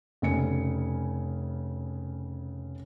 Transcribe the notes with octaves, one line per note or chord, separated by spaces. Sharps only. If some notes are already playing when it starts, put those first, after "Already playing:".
F1 C#3 G#5 C#7